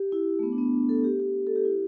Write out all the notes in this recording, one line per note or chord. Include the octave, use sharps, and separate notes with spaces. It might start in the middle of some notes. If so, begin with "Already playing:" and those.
Already playing: G4
E4
A3
B3
D4
B3
D4
A4
G4
G4
A4
G4
E4